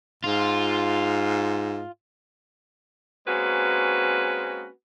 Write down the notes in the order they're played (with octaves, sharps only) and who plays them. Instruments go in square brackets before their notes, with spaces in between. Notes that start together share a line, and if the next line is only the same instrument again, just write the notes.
[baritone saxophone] G#2 [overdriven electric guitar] F4
[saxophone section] G#3 A#3 C4 C#4 F#4 B4